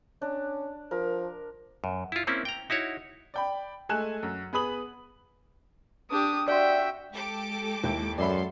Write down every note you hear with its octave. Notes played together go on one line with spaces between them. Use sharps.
C#4 D4
F3 A#4
F#2
E4 F4
A#3 C4 C#4 E4
G5 A#5
D#4 E4 F#4 C#5
D5 G5 B5
G#3 A3 G#5 F#6 E7
F#2
B3 G#4 B4 B5 D#6 F#7
D4 G4 D#6
F#4 D5 E5 G5 C6
G#3 G4 A4 D6
D#2 E4 G5
F#2 A4 D5 E5 B5 C6